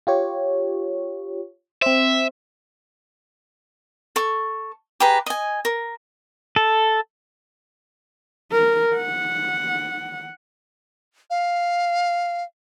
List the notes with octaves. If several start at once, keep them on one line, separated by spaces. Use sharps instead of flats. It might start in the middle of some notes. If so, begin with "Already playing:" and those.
F4 G4 C#5
C4 C5 E5
A4 C#6
G4 G#4 B4 A#5
D#5 G#5
A#4
A4
A#4
F#5
F5